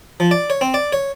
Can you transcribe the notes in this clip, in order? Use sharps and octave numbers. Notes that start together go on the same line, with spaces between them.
F3
D5
C#5
C4
D5
C#5